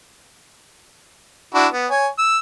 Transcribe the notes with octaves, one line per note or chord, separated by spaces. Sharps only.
D4 E4 F#4
B3
C#5 G#5
E6